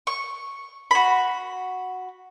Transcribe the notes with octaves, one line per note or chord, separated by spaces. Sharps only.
C#6
F#4 B5